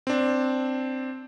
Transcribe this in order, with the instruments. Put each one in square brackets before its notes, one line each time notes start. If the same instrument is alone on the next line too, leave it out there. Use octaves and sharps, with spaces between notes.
[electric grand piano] C4 D4